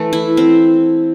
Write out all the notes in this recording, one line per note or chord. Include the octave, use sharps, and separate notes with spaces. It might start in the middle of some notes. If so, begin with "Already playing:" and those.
Already playing: E3 A3
E4
C4